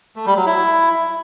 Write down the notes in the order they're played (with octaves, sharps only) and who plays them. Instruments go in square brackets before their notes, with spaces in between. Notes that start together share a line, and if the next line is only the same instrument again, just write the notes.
[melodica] A3
G3
F#3
E4